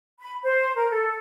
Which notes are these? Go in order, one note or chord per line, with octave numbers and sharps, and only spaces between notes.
B5
C5
A#4
A4